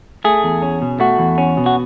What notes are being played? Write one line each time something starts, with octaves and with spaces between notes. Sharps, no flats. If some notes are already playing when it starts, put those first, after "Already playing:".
A3 G#4
E2
C#4
B2
A3 F#4
E2
C#4
B2
F#4